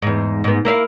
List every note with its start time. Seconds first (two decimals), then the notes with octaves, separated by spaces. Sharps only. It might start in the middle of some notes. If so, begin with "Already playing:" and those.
0.02 E2 G#2
0.44 G#2 B3
0.65 A#3 E4 F5